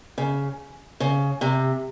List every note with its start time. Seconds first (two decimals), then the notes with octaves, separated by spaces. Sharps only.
0.18 C#3
1.00 C#3
1.41 C3